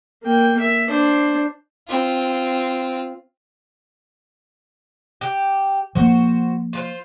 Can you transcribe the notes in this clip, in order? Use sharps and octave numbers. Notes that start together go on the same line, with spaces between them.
A#3 G5
E5
D4 C5
C4 F4
G4
F3 A#3 F#4 C5
F4 B4 C5